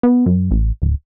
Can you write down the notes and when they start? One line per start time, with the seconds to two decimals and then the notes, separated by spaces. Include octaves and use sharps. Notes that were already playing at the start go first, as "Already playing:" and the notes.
0.03 B3
0.26 F#2
0.51 A1
0.82 D1